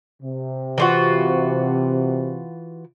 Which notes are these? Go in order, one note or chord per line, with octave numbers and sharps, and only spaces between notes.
C3
E3 F4 F#4